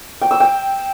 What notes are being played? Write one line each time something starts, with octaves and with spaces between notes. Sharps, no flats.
G5
E6
G5